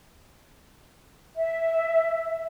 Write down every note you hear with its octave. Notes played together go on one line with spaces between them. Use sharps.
E5